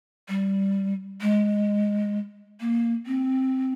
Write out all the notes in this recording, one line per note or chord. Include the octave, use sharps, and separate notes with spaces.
G3
G#3
A#3
C4